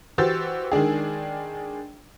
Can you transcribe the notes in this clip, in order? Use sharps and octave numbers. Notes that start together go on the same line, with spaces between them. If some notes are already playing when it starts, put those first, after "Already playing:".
E3 F#4 G4 C5 E6 A6
D#3 G#3 D4 G#4